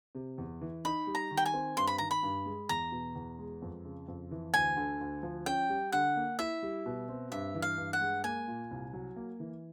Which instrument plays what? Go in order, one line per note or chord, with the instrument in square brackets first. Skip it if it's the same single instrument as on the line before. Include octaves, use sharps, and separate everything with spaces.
[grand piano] C3
E2
E3
[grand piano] D#4 [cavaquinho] B5
[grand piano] G3
[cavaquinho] A#5
[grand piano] D#3
[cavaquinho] G5
G#5
[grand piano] C4
[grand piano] G2 [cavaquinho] C6
[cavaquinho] B5
[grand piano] D#3 [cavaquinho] A#5
[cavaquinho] B5
[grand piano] G2
G#3
[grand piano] E2 [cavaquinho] A#5
[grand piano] B2
E2
G#3
F2
C#3
F2
E3
[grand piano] D2 [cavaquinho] G#5
[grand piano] D3
D2
F3
[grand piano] C#4 [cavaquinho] G5
[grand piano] G3
[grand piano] D3 [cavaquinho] F#5
[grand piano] A#3
[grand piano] E4 [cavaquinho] E5
[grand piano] G3
B2
C4
[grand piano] G2 [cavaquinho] E5
[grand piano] E3
[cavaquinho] F5
[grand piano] G2
[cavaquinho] F#5
[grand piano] G#3
[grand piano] A#3 [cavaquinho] G#5
[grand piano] A#2
C2
F#3
A#3
E3